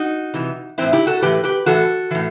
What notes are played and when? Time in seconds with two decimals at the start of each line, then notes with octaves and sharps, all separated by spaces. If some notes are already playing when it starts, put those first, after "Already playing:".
Already playing: D#4 F#4
0.34 C3 E3
0.78 A2 E3 C4 E4
0.93 E4 G4
1.07 F#4 A4
1.22 A2 E3 G4 B4
1.44 G4 B4
1.66 A2 E3 F#4 A4
2.11 A2 E3